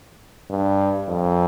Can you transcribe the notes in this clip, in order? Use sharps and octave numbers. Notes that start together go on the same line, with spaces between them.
G2
F2